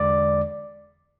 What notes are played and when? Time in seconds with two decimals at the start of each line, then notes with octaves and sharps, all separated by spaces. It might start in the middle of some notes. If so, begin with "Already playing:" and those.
Already playing: E2 D3 G#3 D5